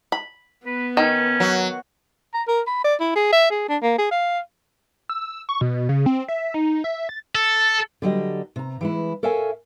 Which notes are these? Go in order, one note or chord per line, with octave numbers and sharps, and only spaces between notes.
B5
B3 B4
D#3 C#4
F#3
A#5
A#4
B5
D5
E4
G#4
E5
G#4
D4
A#3
G#4
F5
E6
C#6
B2
C#3
C4
E5
D#4
E5
A6
A4
D3 F#3 G3 D#5
C3 A#5
E3 G#3 E4
A4 A#4 C#5 E5 F5 G#5